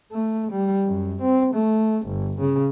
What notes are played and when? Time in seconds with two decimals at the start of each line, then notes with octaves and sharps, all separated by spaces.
0.12 A3
0.52 G3
0.86 F#2
1.21 C4
1.54 A3
2.06 G1
2.40 C#3